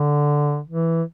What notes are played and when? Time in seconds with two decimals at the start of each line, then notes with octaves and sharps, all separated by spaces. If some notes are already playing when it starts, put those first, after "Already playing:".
Already playing: D3
0.68 E3